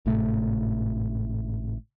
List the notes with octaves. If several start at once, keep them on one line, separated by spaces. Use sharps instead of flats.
G#1 A2 C3 A3